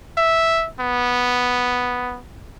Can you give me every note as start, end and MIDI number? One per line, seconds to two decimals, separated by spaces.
0.17 0.68 76
0.80 2.19 59